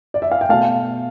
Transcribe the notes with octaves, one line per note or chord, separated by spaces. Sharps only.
D5
E5
F5
G5
B2 A3 F5 A5